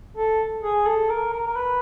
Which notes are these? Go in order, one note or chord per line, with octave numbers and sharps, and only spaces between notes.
A4
G#4
A4
A#4
A#4
A#4
B4